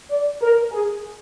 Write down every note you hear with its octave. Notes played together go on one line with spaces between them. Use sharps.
D5
A#4
G#4